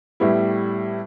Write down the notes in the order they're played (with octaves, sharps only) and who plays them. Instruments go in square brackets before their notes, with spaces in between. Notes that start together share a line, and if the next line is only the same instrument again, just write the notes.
[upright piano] A2 G3 B3 E4